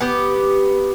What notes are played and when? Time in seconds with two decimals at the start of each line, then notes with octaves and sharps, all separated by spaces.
0.01 B3 G4